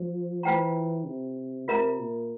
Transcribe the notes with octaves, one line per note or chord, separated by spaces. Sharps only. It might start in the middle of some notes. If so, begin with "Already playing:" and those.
Already playing: F3
E3 F4 C5 G5 A#5
C3
C3 F4 A#4 E5 A#5
A#2